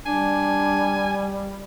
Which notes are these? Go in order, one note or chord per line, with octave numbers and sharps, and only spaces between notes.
G3 D4 G#5